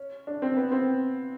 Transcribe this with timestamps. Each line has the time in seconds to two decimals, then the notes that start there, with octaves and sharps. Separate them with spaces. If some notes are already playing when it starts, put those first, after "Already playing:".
Already playing: C#4
0.27 D4
0.42 C4
0.57 B3
0.72 C4